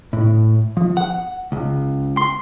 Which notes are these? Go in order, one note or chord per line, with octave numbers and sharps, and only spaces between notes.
A2
F3
F#5
C#2
C6